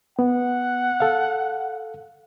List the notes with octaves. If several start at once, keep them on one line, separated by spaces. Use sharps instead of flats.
B3 F#5
A4 F5